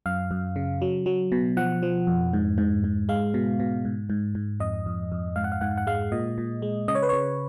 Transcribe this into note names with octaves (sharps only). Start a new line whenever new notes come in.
F#2 F5
F#2
C#3
F#3
F#3
B2
F3 F#5
F3
F2
G#2
G#2
G#2
G#3 F5
B2
B2
G#2
G#2
G#2
F2 D#5
F2
F2
G#2 F5
F#5
F5
G#2 F#5
F#5
G#3 F5
A#2 D#5
A#2
G#3
C#3 D#5
C#5
B4
C#3 C#5